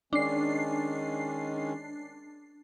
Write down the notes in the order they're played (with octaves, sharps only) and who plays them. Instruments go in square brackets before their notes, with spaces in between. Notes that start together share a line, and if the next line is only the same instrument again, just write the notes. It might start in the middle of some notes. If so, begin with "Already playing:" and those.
[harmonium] D#3 G#3 C#4 [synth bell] D4 C7